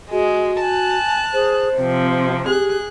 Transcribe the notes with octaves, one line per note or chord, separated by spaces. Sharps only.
G#3 F#4 G#4
G#5 A5 F#6
G#4 C5
C3 F3 C4
G4 G#4 F#6